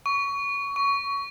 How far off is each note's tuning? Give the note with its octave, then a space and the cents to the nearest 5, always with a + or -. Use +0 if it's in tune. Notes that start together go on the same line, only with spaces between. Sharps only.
C#6 +20
C#6 +15